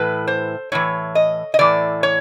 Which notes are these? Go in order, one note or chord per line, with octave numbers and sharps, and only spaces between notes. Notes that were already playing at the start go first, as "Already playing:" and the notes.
Already playing: A2 E3 B4
C5
A2 E3 C#5
D#5
D#5
A2 E3 D5
C#5